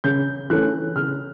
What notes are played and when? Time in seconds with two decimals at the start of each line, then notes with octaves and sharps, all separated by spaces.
0.04 C#3 G6
0.50 E3 A3 C#4 F#6
0.96 C#3 F6